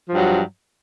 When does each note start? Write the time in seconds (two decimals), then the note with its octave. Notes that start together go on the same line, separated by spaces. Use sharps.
0.09 F3
0.13 G2
0.16 F#3